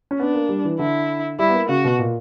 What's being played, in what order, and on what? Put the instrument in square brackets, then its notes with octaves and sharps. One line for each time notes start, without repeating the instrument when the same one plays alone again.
[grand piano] C#4
[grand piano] B3 [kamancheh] D4
[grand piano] A#3
G3
E3
[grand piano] D3 [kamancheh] E4
[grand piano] G3 [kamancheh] E4
[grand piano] B3
A#3
[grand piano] C#3 [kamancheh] F#4
[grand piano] B2
A#2